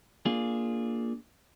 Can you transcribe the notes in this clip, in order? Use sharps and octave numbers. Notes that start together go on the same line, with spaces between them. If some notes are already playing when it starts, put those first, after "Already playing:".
A#3 D4 F4 G#4